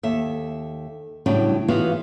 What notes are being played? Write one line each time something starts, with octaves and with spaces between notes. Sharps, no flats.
D#2 A4 E5
A2 C#3 F#3 G3 D4
E3 B3 F4 F#4 G#4 F5